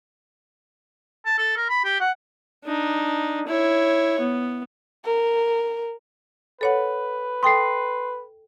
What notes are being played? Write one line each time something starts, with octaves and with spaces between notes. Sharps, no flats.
A5
A4
A#4
B5
G4
F#5
D4 D#4
E4 C#5
B3
A#4
A4 B4 C#5 F#5
A4 G5 C6 D#6 C7